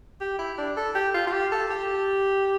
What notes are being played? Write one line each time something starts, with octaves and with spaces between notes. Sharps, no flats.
G4
E4
D4
A4
G4
F4
F4
G4
A4
G4